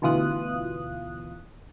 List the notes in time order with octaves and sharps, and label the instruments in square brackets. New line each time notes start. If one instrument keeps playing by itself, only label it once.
[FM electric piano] D2 B2 E3 F4 D#6 F#6